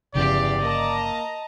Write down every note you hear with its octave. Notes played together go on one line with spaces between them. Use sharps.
G1 E2 C#3 F3 G4 D5 F5
A#3 D#5 A5 A#5